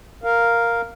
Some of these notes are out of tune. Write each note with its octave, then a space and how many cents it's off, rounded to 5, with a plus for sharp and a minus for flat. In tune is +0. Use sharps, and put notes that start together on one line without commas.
A#4 +0 F5 +0